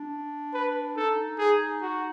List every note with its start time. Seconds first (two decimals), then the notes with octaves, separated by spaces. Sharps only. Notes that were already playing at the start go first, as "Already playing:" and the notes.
Already playing: D4
0.53 B4
0.96 D#4 A4
1.39 G#4
1.81 F#4